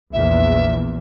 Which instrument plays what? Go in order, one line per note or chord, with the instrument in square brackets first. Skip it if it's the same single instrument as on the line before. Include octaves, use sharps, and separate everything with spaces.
[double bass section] A#1 E2 [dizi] E5